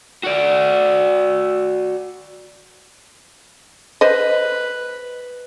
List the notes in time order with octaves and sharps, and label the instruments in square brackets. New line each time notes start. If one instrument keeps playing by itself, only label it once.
[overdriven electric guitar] F#4 D5
[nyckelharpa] B4 [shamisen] C5 D#5